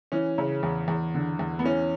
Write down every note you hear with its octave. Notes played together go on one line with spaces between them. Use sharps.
E3 C#4
C#3
E2
E2
D3
E2
B3
E3 C#4